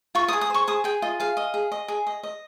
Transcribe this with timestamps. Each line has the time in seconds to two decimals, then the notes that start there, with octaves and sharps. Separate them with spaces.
0.15 F4 C#6
0.28 D#6
0.33 G#4
0.41 D#6
0.50 C5 C#6
0.68 G#4 D#6
0.84 G#4 G5
1.02 F4 D#5
1.20 G#4 F5
1.37 D#5
1.54 G#4
1.72 D#5
1.88 G#4
2.07 D#5
2.23 D#5